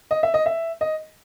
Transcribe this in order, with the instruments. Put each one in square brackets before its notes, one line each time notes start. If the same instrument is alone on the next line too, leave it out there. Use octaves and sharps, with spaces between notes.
[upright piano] D#5
E5
D#5
E5
D#5